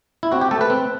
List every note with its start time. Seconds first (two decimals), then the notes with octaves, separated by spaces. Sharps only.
0.23 E4
0.32 C4 F#4
0.41 G4
0.51 A3 A4
0.61 B4
0.70 C4